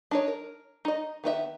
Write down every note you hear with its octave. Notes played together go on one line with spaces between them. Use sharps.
D4 D#4 C#5
A#4
D#4 D#5
D#3 B3 F4 E5